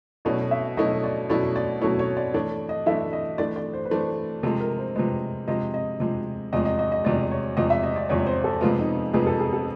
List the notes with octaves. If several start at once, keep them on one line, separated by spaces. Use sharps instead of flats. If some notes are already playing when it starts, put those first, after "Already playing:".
B2 F#3 A3 C#4 E4 D5
E5
B2 F#3 A3 C#4 E4 D#5
D5
B2 F#3 A3 C#4 E4 D5
D5
B2 F#3 A3 C#4 E4 C#5
C#5
D5
E3 A3 D4 C#5
D#5
E3 A3 D4 E5
D#5
E3 A3 D4 D5
D5
C5
B4
E3 A3 D4 C5
C3 F3 G#3 A4
A#4
C5
C3 F3 G#3 B4
C3 F3 G#3 D#5
D#5
C3 F3 G#3
E2 C3 F3 G#3 D#5
D#5
D#5
D#5
E2 C3 F3 G#3 D5
C#5
E2 C3 F3 G#3 D#5
E5
D#5
D5
E2 C3 F3 G#3 C#5
C5
A4
F2 C3 F3 G#3 B3 F4
D#4
D#4
F2 C3 F3 G#3 B3 G#4
A4
G#4
A4